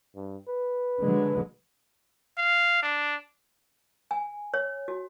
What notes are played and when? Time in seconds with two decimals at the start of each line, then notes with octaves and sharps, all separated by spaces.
0.15 G2
0.48 B4
1.02 D3 F#3 G#3
2.38 F5
2.83 D4
4.11 G#5
4.54 C#5
4.88 F#4